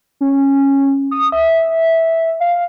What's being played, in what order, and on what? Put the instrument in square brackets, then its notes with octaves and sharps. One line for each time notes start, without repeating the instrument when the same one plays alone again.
[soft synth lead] C#4
D#6
E5
F5